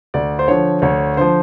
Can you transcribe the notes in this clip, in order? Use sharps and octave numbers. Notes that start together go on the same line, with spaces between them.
D2 D5
C5
D3 F3 C#5
D2 C#5
D3 F3 C5